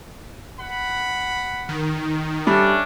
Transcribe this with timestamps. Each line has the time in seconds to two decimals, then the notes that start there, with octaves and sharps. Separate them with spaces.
0.59 F#5 B5
1.69 D#3
2.47 G3 A3 C#4 D4 A4